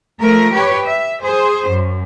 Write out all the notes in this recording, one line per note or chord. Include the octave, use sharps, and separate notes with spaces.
F3 A3 A#4
G4 B4 C#5
E5
G#4 C5
F#2